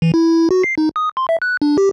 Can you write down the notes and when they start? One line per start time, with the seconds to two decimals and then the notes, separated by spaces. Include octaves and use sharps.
0.02 E3
0.14 E4
0.32 E4
0.51 F#4
0.63 C7
0.78 D#4
0.96 D#6
1.17 C6
1.29 E5
1.42 F#6
1.62 D4
1.78 G4